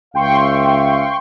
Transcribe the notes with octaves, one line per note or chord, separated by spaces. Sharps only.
C#2 E5 F5 G5 C6 C#6